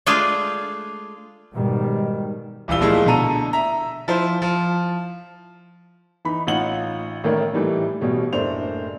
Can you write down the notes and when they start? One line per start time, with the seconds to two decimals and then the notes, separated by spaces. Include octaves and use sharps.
0.06 G#3 A3 D4 F4 G#4 F5
1.53 G#2 B2 D#3 G3
2.68 D#1 E3 G3 F5 E6 G7
2.81 A#2 F3 G#3 A3 E4
3.06 B2 D3 A4 A#5 D#7
3.53 E5 A#5
4.08 F3 E4 C5
4.42 F3
6.25 E3 D#4 B5
6.47 A1 D#4 F4 F#5 F#7
7.24 A1 D#3 A3 A#4 D5
7.53 A2 E3 G3 A3 D#4
8.01 A1 B2 G3
8.33 F#1 A2 A3 D4 C5 F7